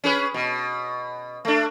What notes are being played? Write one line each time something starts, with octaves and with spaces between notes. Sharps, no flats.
C#4 G#4 B4
B2
A3 D4